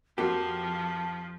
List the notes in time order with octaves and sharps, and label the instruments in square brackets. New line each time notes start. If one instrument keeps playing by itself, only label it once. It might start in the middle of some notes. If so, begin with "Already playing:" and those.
[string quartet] F2 F3 [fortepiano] A#3 C4 F#4 [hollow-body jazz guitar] G4 [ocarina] A5